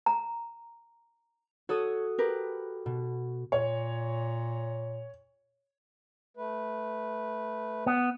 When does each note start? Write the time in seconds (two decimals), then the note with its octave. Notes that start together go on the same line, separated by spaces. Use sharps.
0.06 A#5
1.69 F#4 A4 C#5 D#6
2.19 G4 A#4 B4
2.86 B2
3.52 A#2 C#5
6.37 A3 B4
7.86 B3